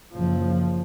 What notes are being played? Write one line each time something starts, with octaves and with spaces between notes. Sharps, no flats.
F#1 F3